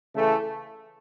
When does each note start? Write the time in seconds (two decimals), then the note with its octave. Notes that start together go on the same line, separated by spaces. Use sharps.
0.15 C#3 E3 A3